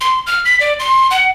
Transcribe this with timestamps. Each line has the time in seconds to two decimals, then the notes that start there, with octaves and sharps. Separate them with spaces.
0.01 C6
0.27 F6
0.45 B6
0.60 D5
0.80 C6
1.11 F#5